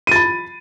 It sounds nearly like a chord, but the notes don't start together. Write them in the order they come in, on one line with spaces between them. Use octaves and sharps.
D#7 A6 B5